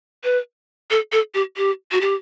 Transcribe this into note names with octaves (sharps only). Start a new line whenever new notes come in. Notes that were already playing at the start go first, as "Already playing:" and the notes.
B4
A4
A4
G4
G4
F#4
G4